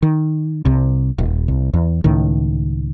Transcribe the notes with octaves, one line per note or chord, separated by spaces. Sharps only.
D#3
C2 C3
D#1
C2
E2
C#2 A2 D#3